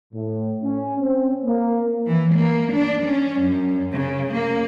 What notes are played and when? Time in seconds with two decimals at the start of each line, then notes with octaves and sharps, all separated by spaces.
0.13 A2
0.63 C#4
1.00 C4
1.44 A#3
2.08 E3
2.38 A#3
2.73 D4
3.05 C#4
3.43 F#2
3.92 C#3
4.32 A#3